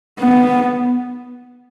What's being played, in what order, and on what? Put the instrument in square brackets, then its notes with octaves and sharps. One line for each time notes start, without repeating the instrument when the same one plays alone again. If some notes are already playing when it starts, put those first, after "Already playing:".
[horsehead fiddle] B3